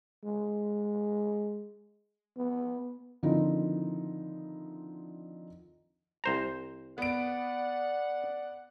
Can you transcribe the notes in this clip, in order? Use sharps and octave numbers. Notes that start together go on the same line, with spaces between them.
G#3
B3
D3 D#3 F3 C4 D#4 E4
C2 C5 A#5
B3 D5 F#5 D7